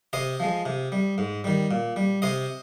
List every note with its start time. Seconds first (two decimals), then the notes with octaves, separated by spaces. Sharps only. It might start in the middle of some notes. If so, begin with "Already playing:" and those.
0.13 C3 C5 D#5
0.40 F3 G#3
0.66 C3
0.92 G3
1.18 G#2
1.44 D#3 G3
1.71 A#2
1.96 G3
2.22 C3 C5 D#5